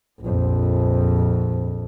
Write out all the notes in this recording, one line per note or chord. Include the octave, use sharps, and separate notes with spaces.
A#1 F2